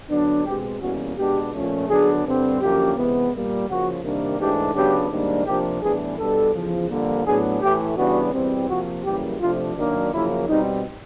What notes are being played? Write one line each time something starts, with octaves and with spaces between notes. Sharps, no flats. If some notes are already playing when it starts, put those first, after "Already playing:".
D3 F#3 B3 D4
B2 G#3 C4 G4
E2 B2 G3 A#3 C#4 F#4
B2 G#3 B3 D4 G4
A#2 F3 A3 C#4
D3 F#3 B3 D4 G#4
G2 D3 G3 C4
F#2 D3 F3 A#3 C#4 G4
C3 E3 G#3 B3
A#2 G3 A#3
C#3 F3 A#3 F#4
C3 D#3 G3 A#3 D4
G#2 E3 A3 D4 G4
C#3 F#3 B3 D4 G4
G#2 D#3 G3 A#3 D4
C3 F3 A#3 D4 G4
A2 E3 G3 B3 D4 G#4
B2 G3 B3 D4 A4
E2 C#3 F3
F2 D3 G3 A#3
A2 F#3 B3 D4 G#4
A2 E3 A3 G4
C#3 E3 G3 B3 D4 F#4
E2 B2 G3 C4
C3 F3 A#3 F#4
F#2 C#3 E3 G3 A#3 G4
C3 F3 A3 D4 F4
F#2 D#3 F#3 A#3 D4
F#2 C#3 F3 A#3 E4
B2 G3 C4 D#4